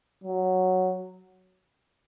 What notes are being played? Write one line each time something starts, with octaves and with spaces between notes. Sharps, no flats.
F#3